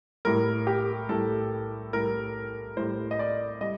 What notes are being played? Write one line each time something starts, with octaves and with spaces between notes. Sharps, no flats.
A2 G3 A#4
G4
A2 G3 A4
A2 G3 A#4
A2 G3 C5
D#5
D5
G3 D#5